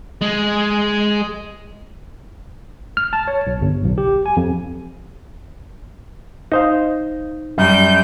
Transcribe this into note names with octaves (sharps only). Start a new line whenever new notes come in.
G#3
F6
A5
C#5
B1
G1
B1
G4
G#5
F2
D#4 C5 F5
F#2 G3 G6